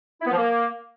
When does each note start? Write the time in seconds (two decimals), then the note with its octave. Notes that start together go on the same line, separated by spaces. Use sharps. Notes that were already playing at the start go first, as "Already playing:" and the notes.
0.21 E4
0.26 B3
0.31 F3
0.36 A#3